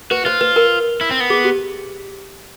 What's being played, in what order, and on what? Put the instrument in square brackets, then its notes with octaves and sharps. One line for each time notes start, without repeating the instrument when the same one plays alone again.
[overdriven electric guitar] F#4 [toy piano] B4
[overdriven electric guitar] F4 [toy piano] C5
[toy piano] B4
A#4
[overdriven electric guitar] E4
C4
B3
[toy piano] G#4
G4